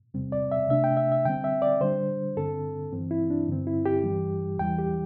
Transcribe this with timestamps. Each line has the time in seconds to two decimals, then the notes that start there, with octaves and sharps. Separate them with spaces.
0.14 E2 C3 G3 C4
0.32 D5
0.52 E5
0.69 C3 A3 D4 E5
0.84 G5
0.97 E5
1.12 E5
1.25 D3 G3 C4 G5
1.44 E5
1.62 D5
1.80 D3 G3 D4 C5
2.37 G2 D3 C4 A4
2.93 G2 E3 C4
3.11 E4
3.30 D4
3.48 G2 D3 C4
3.67 E4
3.86 G4
4.04 G2 E3 G3
4.59 E2 E3 G3 G5
4.78 G4